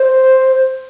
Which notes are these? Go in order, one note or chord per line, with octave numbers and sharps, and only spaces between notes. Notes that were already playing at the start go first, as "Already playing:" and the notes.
Already playing: C5